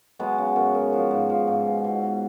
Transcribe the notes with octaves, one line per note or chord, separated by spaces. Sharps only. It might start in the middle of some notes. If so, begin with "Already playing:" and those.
F#3 G#3 B3
C#3
F#2
F#2
F3
G#2
F3
G#2
B2
B2
B2